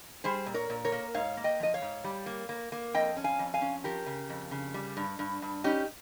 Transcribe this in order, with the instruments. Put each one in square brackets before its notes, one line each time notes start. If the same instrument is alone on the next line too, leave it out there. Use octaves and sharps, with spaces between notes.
[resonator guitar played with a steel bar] G3 G#4 C5
A#2
A#4 C#5
A#2
A#4 C#5
A#3
G#2 C#5 F5
A#3
D#5 G5
F3 D#5
C#5 F5
G#2
G3
A#3
A#3
A#3
F2 D#5 G5
C#4
F5 G#5
F2
F5 G#5
C#4
F3 G4 A#4
C#3
F2
C#3
G3
G2
G2
G2
C#4 D#4 G4